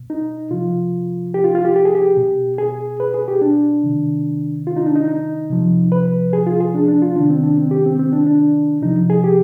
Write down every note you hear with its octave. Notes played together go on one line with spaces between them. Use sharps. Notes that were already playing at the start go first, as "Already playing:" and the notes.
Already playing: B2
D#4
C3 F3 F4
G4
F4
F4
G4
G4
G#4
G4
B2
G#4
B4
G#4
G4
D4
C3 D#3
F4
D#4
D4
D#4
D#4
C3 F3
B4
G#4
F4
G#4
D4
D4
F4
C3 D#3 D4
C4
D4
C4
G4
C4
C4
D4
D4
C3 F3 D#4
G#4
G4